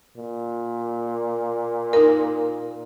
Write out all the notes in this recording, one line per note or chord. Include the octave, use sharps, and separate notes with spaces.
A#2
D#4 A#4